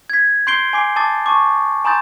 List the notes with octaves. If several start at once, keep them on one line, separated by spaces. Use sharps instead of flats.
G#6 B6
C6 G6 C7 D7 G7
G#5 D6 C7
A5 D6 D#6 A6
A5 C#6 D6
G#5 A#5 C6 D#6 G6 A6